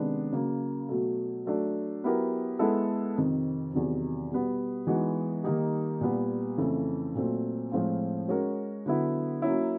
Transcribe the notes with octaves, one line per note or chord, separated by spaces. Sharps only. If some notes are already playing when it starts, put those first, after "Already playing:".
Already playing: C3 D#3 G#3 B3 D4
C#3 F#3 A#3
B2 F#3 A3
F#3 A3 D4
F#3 B3 E4 G4 A#4
G#3 B3 E4 A4
F2 C3 D#3
E2 C3 D#3 F#3
B2 G3 B3
E3 G#3 B3 D#4 F#4
D#3 G3 A#3 D#4 G4
A#2 G3 B3
F2 C#3 E3 A3
A#2 F#3 A3 C4
A2 F3 G#3 C4 F4
G#3 C#4 F#4 A#4
D3 F#3 B3 E4
F#3 A#3 C#4 E4